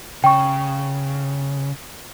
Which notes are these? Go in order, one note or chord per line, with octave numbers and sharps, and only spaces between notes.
C#3 G5 C#6